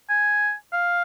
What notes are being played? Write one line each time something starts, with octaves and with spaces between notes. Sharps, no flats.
G#5
F5